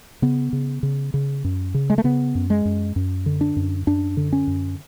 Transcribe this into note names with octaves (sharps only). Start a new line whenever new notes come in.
C#3 B3
C#3
C#3
C#3
F#2
C#3
G#3
A3
C#3 B3
F#2
G#3
F#2
F#2
D3
D4
F#2
F#2 D4
D3
C#4
F#2